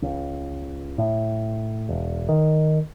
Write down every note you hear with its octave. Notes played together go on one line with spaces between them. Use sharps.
C#2
A2
E1
D#3